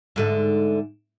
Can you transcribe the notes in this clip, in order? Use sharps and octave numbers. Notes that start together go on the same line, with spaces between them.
G#2 D3 A3